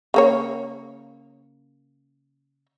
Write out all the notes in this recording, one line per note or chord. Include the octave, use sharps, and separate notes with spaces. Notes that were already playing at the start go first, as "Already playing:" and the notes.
C#3 A#3 C#5